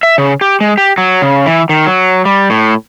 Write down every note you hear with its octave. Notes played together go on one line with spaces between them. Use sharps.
E5
C#3
G4
G#3
G4
F#3
C#3
E3
D#3
F#3
G3
A2